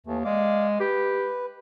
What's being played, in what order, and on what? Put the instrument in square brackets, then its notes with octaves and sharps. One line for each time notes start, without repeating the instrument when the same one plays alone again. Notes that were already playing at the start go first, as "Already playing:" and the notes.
[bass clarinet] D#2 [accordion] E3 A3
[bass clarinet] G#3 [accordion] D5 F5 D6
[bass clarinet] G4 [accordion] B4